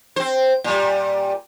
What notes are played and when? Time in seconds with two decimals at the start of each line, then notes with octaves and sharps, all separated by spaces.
0.16 C4 C5
0.64 A#2 G3